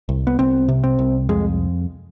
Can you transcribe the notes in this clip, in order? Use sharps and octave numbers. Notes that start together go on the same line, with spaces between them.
C2
B3
C2 C4
C3
C4
C2
F2 G#3